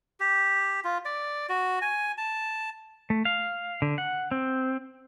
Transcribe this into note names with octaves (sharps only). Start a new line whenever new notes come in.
G4
F4
D5
F#4
G#5
A5
A3
F5
D3
F#5
C4